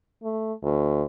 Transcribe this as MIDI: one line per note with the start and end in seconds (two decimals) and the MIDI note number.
0.23 0.53 57
0.63 1.03 38